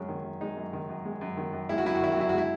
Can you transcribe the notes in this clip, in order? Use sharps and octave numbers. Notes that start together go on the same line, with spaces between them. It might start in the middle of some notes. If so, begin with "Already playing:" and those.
Already playing: F#2 G#3 C#4
D#3
F#2
G#3 D#4
F#2
D#3
F#2
G#3
F#2
D#3
F#2
G#3 E4
F#4
F#2 E4
F#4
D#3 E4
F#4
F#2 E4
F#4
G#3 E4